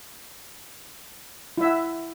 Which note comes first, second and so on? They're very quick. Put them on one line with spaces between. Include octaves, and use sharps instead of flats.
E4 E5 F#5